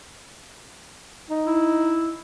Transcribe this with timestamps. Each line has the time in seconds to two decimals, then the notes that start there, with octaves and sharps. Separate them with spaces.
1.30 D#4
1.47 E4